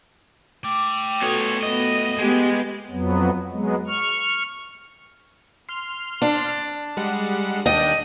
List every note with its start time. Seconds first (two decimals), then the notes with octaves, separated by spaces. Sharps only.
0.64 A3 G5 D6
1.22 B3 F#4 A4 C#5 D#6
1.63 B3 D#5
2.19 G#3 B3 G4
2.91 F2 F#3 B3
3.52 F#3 G#3 B3
3.88 C#6 F6
5.69 C6 F6
6.22 D4
6.97 G3 G#3 F#5
7.66 D#2 D4 D#5 G5